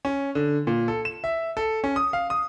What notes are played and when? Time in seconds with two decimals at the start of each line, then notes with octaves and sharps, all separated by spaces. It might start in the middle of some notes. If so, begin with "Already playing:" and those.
0.05 C#4
0.35 D3
0.67 A#2
0.88 A4
1.05 E7
1.24 E5
1.57 A4
1.84 C#4
1.96 D#6
2.13 F5
2.30 D#6